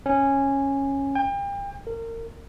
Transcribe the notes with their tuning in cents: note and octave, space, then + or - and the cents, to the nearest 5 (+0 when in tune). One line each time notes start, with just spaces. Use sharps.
C#4 -10
G5 +35
A#4 -30